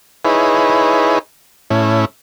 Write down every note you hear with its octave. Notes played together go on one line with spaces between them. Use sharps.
D#4 E4 G#4 B4 C#5
A2 C#4 E4